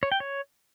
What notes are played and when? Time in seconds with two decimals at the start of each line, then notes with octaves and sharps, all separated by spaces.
0.03 C#5
0.12 G5
0.20 C#5